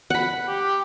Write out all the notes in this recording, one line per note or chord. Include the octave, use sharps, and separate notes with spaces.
F#5 B5
G4